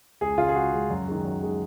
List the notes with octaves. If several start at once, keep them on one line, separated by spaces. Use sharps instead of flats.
C#2 G#4
C#3 G#3 F4
G#4
C#2 F#4
C#3 G#3
F#2
D#3 G#3
F#2
D#3 G#3